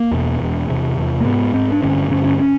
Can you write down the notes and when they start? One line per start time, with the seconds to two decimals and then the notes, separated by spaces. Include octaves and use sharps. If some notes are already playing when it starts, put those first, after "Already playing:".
Already playing: A#3
0.11 E2 B2
0.40 E2 B2
0.68 E2 C3
0.97 E2 C3
1.21 A#3
1.25 G#2 B3
1.53 G#2 C4
1.72 D4
1.82 G2 D3 C#4
2.10 G2 D3 C#4
2.24 C#4
2.39 C#4